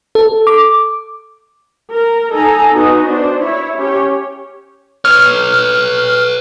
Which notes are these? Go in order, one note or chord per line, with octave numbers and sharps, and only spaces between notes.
A4
D6
A#4
D#4 A4 G#5 A#5
B3 D#4 F#4 D#5
D4 C5
E4 C#5
C#4 G4 C#5
B4 C#5 F6